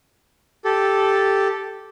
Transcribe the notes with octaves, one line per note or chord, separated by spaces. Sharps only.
G4 A4